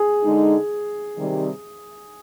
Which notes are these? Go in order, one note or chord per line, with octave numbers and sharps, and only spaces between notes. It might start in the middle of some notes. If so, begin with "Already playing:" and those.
Already playing: G#4
D3 G#3 D#4
C3 D#3 G3 C4